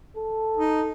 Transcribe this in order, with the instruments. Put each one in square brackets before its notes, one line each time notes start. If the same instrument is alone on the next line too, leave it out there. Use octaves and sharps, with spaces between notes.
[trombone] A4
[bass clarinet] D#4